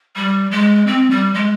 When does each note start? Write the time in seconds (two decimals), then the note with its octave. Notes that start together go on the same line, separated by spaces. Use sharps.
0.16 G3
0.51 G#3
0.87 C4
1.10 G3
1.34 G#3